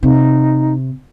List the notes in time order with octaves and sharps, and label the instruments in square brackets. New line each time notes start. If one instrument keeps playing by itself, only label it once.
[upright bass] C3 [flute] D#4